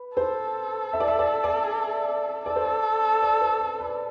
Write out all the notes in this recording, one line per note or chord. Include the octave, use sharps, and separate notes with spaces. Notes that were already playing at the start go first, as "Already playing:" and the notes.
Already playing: B4
A4 C5
E5
D5
E5
D5
D5
A4 D5
C5
D5
D5
C5
B4
B4